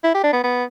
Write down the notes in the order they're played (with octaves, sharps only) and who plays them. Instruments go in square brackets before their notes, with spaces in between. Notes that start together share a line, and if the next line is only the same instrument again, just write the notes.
[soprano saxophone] E4
G4
D4
B3
B3